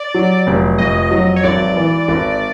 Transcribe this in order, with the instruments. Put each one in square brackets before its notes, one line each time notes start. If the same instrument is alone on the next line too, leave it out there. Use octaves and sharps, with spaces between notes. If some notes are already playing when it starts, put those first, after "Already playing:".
Already playing: [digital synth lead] D5
[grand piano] F#3
F1
[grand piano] F2 [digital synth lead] D#5
[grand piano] F#3
[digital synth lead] C#5
[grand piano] G#1 [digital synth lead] D5
[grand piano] E3
G#1